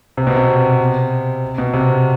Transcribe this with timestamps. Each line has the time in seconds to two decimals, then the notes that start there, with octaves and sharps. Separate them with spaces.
0.17 C3
0.27 B2
0.36 C3
1.58 B2
1.73 C3